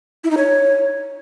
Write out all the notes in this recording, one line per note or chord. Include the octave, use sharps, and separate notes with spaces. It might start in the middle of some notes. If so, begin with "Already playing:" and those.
E4
D#4
C#5